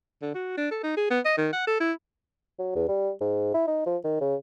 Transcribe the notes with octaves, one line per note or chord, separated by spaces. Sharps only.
D3
F#4
D4
A4
D#4
G#4
B3
D#5
D#3
F#5
A4
E4
F#3
E2
G3
G#2
E4
D#4
F3
D#3
C#3